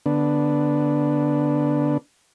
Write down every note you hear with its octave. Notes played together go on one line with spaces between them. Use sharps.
D3 B3 D4